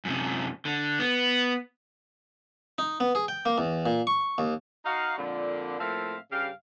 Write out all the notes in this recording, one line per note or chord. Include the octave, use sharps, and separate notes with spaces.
F#2 C3
D3
B3
D#4
B3
G#4
G5
A#3
E2
A#2
C#6
D#2
D#4 F#4 F5
F2 A#2 D3
A2 F3 A#3 C4 E5 F5
G2 C#3 G4 F5